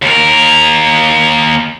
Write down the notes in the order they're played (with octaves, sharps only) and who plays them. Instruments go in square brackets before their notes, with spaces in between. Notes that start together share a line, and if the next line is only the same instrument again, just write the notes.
[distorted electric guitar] D#2 A#4